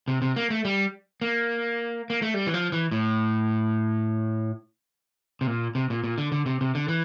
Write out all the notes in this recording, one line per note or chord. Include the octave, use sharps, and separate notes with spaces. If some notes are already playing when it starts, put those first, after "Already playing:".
C3
C3
A#3
A3
G3
A#3
A#3
A3
G3
E3
F3
E3
A2
C3
A#2
C3
A#2
A#2
D3
D3
C3
C3
D3
E3